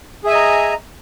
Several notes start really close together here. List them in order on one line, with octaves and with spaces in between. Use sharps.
G#4 E5 G#5 D#5 A#5